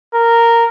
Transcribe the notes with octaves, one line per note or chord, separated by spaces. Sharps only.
A#4